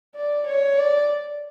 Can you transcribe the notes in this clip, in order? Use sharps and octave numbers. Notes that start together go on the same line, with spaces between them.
D5
C#5
D5